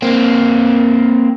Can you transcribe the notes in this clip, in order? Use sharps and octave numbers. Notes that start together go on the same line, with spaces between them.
A#3 C4